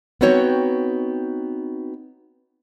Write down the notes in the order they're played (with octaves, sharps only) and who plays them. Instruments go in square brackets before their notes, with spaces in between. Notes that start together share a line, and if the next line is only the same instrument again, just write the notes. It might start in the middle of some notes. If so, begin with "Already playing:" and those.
[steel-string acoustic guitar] B3 C4 D#4 F#4 C#5 G5